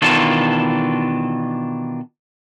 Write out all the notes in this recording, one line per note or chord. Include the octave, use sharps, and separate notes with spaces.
B2 D#3 E3 D4 F4 A4